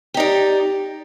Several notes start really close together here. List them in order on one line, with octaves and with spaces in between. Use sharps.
G4 D#4 D5